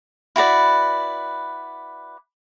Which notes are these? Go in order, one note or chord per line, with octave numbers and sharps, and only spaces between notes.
E4 F#4 B4 D5